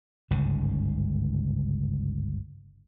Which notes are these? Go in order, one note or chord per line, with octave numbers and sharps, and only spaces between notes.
G1 C#2 G#2 C#3